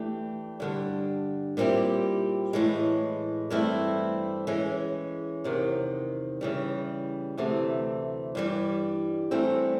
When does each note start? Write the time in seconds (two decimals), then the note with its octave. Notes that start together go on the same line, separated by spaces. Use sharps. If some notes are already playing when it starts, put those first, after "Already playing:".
Already playing: E3 A3 D4 G4
0.60 G2 D3 G3
1.57 A#2 G3 C4 E4 G4
2.53 A2 E3 G#3
3.50 G2 E3 A3 C4 E4
4.47 E3 G#3 C#4
5.44 E2 C3 D#3
6.41 C#3 E3 G3
7.37 D2 C3 E3 A3
8.35 G2 E3 G3
9.31 G2 E3 A3 C4